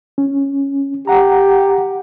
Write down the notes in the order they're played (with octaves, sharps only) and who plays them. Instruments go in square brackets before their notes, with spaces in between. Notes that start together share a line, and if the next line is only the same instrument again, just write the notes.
[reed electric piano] C#4
[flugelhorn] G4 [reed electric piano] F#5 A#5